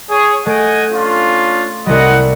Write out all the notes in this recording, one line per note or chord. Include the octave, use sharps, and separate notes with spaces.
G#4 C#5
A3 D#5 F#5 G#5 D7
C#4 D4 F4
C2 G3 D#5 F#5